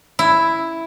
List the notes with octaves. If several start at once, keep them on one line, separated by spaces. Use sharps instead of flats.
E4